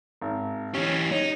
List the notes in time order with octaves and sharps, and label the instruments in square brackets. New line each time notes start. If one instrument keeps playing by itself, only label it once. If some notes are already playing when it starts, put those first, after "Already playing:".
[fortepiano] G#1
[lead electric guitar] E3 G4 [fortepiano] C#4
[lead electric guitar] D#4 [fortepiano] C#5